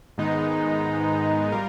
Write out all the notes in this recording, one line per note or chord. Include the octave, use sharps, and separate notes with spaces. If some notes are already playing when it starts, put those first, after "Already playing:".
G#2 D#3 G#3 B3 D#4
G3 F4 A#4